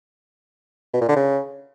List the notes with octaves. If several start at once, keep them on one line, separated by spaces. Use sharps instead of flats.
B2
A#2
D3
C#3